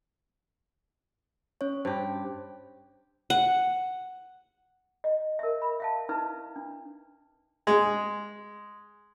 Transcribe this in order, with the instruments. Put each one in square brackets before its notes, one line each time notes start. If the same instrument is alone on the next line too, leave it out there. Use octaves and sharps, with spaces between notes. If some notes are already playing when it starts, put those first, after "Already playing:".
[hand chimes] C#4 C#5
[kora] G2 G4 [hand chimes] C5
[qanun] F#5
[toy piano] D#5
A#4 E5
B5
E5 F5 A5
D#4 E4 B4
D4
[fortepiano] G#3